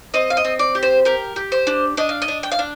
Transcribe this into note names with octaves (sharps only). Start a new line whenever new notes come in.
C4 D#5
F5
D#5
C4
D5
G4
C5
G4 A#4
G4
C5
D4
D4 D#5
F5
D#5
D4
G5
F5
D4